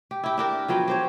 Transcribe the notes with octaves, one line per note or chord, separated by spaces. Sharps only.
G4
E4 G4
D4 G4 A#4
F3 F#3 B3 G5
G4 C5 C#5